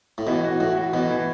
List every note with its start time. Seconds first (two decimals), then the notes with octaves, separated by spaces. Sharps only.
0.18 A2
0.27 B2 E3
0.44 F#4
0.60 A2 F#4
0.77 F#4
0.93 B2 E3
1.11 E3